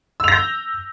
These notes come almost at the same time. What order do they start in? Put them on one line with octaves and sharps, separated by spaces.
E6 F7 A#6 G6